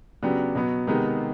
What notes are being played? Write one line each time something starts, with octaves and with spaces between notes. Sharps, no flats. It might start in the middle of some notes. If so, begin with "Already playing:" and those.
C#3 F#3 B3 D4 G4
B2 F#3 B3
C3 D#3 G#3 B3 D#4